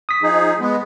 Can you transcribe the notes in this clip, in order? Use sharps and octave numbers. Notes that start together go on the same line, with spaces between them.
D#6 B6
F3 D#4 G#4
G#3 B3